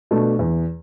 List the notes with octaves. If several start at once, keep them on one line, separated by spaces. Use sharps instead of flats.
B2 A3 D4
E2